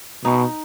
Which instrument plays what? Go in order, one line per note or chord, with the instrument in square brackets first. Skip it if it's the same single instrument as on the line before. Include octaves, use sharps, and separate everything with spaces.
[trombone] B2 [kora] D#4